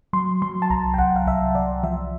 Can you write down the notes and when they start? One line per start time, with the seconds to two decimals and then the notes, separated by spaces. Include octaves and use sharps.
0.13 F#3 C6
0.42 F#3 C6
0.62 A5
0.70 C2 A#5
0.94 G5
0.98 C2 F#5
1.16 F5
1.26 C2 E5
1.55 C2 D5
1.83 F3 E5